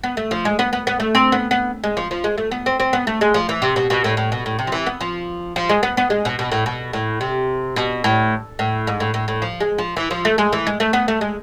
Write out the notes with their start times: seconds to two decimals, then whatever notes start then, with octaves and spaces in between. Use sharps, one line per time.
0.04 B3
0.17 A3
0.31 F3
0.45 G#3
0.59 B3
0.73 B3
0.87 B3
1.00 A3
1.15 C4
1.32 B3
1.51 B3
1.84 G#3
1.97 F3
2.11 F3
2.24 G#3
2.38 A3
2.51 B3
2.66 C4
2.80 C4
2.93 B3
3.07 A3
3.21 G#3
3.34 F3
3.49 E3
3.62 C3
3.76 B2
3.90 B2
4.04 A2
4.17 A2
4.32 B2
4.46 A2
4.59 C3
4.67 F3
4.72 E3
4.86 B3
5.01 F3
5.56 F3
5.69 G#3
5.83 B3
5.97 B3
6.10 G#3
6.25 B2
6.39 B2
6.52 A2
6.66 B2
6.93 A2
7.21 C3
7.76 B2
8.04 A2
8.59 A2
8.87 G#2
9.00 A2
9.14 A2
9.28 A2
9.42 F3
9.60 G#3
9.78 F3
9.97 E3
10.11 F3
10.25 A3
10.38 G#3
10.53 E3
10.67 G#3
10.80 A3
10.93 B3
11.08 A3
11.21 G#3